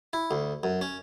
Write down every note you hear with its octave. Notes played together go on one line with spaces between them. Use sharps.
E4
D2
F#2
C#4